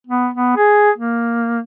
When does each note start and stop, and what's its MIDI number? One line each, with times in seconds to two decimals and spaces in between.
0.07 0.29 59
0.34 0.55 59
0.57 0.91 68
0.98 1.60 58